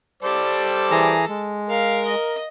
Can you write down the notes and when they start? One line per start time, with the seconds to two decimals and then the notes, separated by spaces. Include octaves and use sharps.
0.23 G3 A4 C5 D5
0.91 E3 G#4 A#5
1.29 G#3
1.70 A#4 F5
2.06 D#5